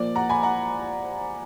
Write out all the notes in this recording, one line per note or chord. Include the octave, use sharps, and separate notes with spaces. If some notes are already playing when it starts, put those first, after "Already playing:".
Already playing: A#2 F3 A#3 D5
F#5 A#5
G#5 B5
F#5 A#5